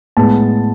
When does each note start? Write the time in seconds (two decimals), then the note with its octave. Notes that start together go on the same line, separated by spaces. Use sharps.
0.17 A2 G#3 B3 A5